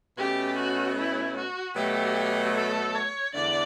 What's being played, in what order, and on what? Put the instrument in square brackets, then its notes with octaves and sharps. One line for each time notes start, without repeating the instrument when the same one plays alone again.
[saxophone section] B2 A3 C#4 [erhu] G4
[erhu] F#4
E4
F#4
[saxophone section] B2 F#3 A3 [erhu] G4
[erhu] A4
C#5
[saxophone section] E2 D3 A3 D4 [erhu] D5